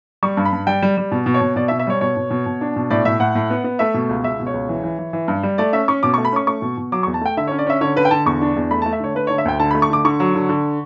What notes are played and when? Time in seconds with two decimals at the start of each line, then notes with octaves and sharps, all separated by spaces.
0.23 G3 C#6
0.37 G2
0.45 B5
0.53 G2
0.67 G3 G5
0.82 G3
0.98 G3
1.12 B2
1.26 B2
1.34 C#5
1.41 B2
1.56 B2 D5
1.68 E5
1.71 B2
1.79 E5
1.87 G3 C#5
2.01 B2 C#5
2.17 B2
2.31 B2
2.46 B2
2.61 D4
2.76 B2
2.90 A2 D5
3.05 A2 E5
3.20 A2 F#5
3.35 A2
3.50 B3
3.64 B3
3.79 A3 E5
3.94 B2
4.09 C#2
4.24 C#2 E5
4.40 B2
4.47 C#5
4.54 C#2
4.69 E3
4.83 E3
4.99 E3
5.13 E3
5.28 G2
5.43 G3
5.58 A3 D5
5.73 C#4 E5
5.88 C#4 C#6
6.03 B2 D6
6.14 C#6
6.18 A3
6.25 B5
6.32 C#4 C#6
6.47 A3 C#6
6.62 B2
6.78 B2
6.92 F#3 D6
7.03 C#6
7.07 E2
7.14 A5
7.21 A3 G5
7.37 D3 E5
7.47 C#5
7.51 C#4
7.59 D5
7.66 C#4 E5
7.81 D3 C#5
7.96 D3 B4
8.05 G5
8.11 D3 A5
8.26 E2 C#6
8.41 D4
8.56 E2
8.71 A3 B5
8.82 A5
8.86 A3
8.93 E5
9.00 D3 C#5
9.15 A3 B4
9.27 C#5
9.30 D3
9.38 E5
9.45 D2 G5
9.59 D3 A5
9.71 B5
9.75 A3
9.82 C#6
9.90 D3 D6
10.05 D3 C#6
10.20 F#3
10.35 D3
10.49 D3